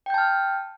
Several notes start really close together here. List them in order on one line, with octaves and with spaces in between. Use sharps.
G5 G6 A5 F6